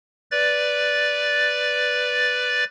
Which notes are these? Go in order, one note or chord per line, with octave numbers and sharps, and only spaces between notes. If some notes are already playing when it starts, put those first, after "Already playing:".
B4 D5 A6